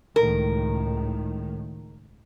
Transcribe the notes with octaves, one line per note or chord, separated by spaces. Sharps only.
C#2 A2 D#3 A#4